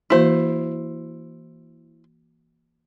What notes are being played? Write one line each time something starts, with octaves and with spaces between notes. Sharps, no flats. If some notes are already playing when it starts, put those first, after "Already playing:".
E3 A#3 E4 F#4 C5